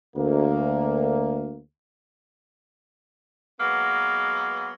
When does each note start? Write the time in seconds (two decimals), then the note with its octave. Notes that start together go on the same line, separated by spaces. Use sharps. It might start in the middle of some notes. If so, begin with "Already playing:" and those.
0.16 D2 A#3
3.60 F#3 G#3 A#3 B3